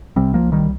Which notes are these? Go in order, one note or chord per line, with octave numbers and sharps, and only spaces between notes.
C2 C3 G3 C4
F3 A#3
D#3 G3